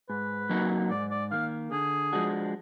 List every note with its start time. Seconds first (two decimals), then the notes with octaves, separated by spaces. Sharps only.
0.09 G#2 B4
0.50 F#3 A#3 D#4 F#4
0.90 G#2 D5
1.11 D5
1.31 D#3 A#3 F5
1.72 D3 G#4
2.13 F3 G#3 D4 F#4